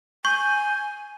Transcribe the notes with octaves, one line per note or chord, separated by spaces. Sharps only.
G#5 C#6 G6